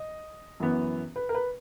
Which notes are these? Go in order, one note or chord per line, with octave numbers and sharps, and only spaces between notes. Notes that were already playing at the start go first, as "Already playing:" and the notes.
Already playing: D#5
F#2 E3 B3
B4
A#4
B4